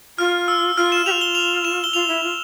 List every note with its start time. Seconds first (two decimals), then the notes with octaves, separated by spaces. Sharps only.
0.18 F4 F6
0.48 E6
0.76 F4 F6
0.92 E7
1.06 F4 G4 F7
1.21 G7
1.35 F7
1.65 E7
1.84 G7
1.93 F4 F7
2.08 E4
2.23 F4